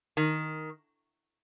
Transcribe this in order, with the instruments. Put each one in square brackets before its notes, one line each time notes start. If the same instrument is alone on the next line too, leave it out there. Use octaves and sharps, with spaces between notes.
[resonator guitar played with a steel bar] D#3